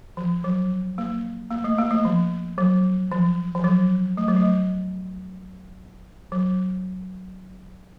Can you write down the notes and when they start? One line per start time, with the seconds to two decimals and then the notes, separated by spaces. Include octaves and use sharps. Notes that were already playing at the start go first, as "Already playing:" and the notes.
0.17 F3
0.44 F#3
0.98 A#3
1.51 A#3
1.64 A3
1.78 A#3
1.91 A3
2.05 F3
2.58 F#3
3.12 F3
3.55 F3
3.64 F#3
4.17 A3
4.28 F#3
4.37 A3
6.32 F#3